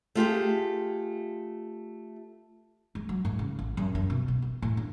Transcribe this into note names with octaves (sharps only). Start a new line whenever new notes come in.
A3 F4 G4 G#4
G#3
F#3
G#2
C#3
A1
F#2
F#2
B2
B3
B3
A2
D4